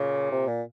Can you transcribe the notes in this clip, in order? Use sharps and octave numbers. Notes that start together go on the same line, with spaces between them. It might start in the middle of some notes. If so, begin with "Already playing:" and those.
Already playing: A#2 C#3
C3
A#2